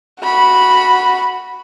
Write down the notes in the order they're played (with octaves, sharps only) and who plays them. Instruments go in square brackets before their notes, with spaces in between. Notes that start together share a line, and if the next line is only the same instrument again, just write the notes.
[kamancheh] F#4 B5